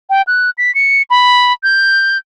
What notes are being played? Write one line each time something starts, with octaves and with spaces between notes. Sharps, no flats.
G5
F#6
B6
C#7
B5
G6